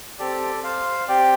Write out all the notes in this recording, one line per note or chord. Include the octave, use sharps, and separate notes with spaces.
C4 G4 A4 D5
C5 F5
C4 G4 D5 G5